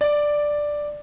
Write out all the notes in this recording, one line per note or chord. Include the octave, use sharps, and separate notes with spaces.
D5